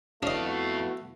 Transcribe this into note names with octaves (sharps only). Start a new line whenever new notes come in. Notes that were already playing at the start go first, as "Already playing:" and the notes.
F2 A3 B3 D4 E4 F#4 D#5 F5